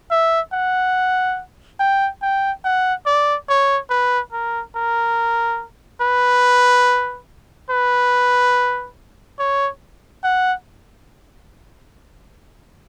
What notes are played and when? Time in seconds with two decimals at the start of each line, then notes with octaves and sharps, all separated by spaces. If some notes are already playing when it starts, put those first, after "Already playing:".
0.11 E5
0.53 F#5
1.79 G5
2.22 G5
2.65 F#5
3.06 D5
3.49 C#5
3.90 B4
4.32 A#4
4.75 A#4
6.01 B4
7.70 B4
9.39 C#5
10.24 F#5